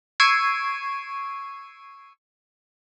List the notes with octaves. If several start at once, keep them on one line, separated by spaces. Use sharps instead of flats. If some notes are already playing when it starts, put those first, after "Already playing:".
C#6 E6 G#6 C7 D7 D#7